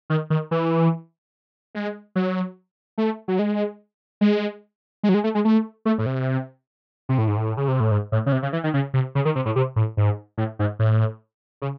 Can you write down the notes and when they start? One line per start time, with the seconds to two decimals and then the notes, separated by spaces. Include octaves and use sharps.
0.10 D#3
0.30 D#3
0.51 E3
1.75 G#3
2.16 F#3
2.98 A3
3.28 F#3
3.39 G#3
4.21 G#3
5.03 G#3
5.09 F#3
5.14 G#3
5.24 A3
5.35 G#3
5.45 A3
5.85 A3
5.98 A2
6.06 C3
7.09 C3
7.18 A2
7.28 G#2
7.37 A2
7.57 C#3
7.68 C3
7.80 A2
7.91 G#2
8.12 A2
8.26 C#3
8.32 C3
8.43 C#3
8.53 E3
8.64 D#3
8.74 C#3
8.94 C3
9.15 C#3
9.25 D#3
9.36 C3
9.46 A2
9.56 C3
9.76 A2
9.97 G#2
10.38 A2
10.59 G#2
10.79 A2
11.62 C#3